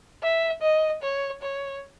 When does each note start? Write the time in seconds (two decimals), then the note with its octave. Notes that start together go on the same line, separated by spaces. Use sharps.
0.23 E5
0.62 D#5
1.02 C#5
1.42 C#5